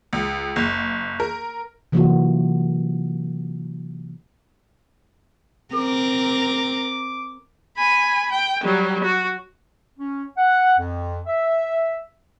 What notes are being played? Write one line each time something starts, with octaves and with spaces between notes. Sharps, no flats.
C#2
F#1
A#4
C3 E3 F#3 A#3 F4 F#4
C4 A#4 D6
G#5 B5
G5
F#3 G3
F#4
C#4
F#5
F2
E5